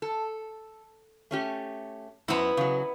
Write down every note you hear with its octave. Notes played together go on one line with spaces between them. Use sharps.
A4
A3 C#4 G4
F#2 B3 E4 C5 A#5
C#3 F#3